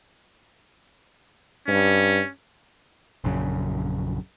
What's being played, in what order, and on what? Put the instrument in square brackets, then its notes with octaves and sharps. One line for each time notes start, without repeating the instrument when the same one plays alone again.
[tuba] G2 [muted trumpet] C#4
[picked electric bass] A#1 F#2 C#3